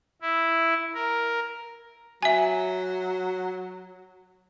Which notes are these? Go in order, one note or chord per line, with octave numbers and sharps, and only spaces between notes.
E4
A#4
F#3 E5 G#5